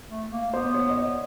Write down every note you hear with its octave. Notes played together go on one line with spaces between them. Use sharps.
A3
A#3
B3 C5
C#5
D#5
D5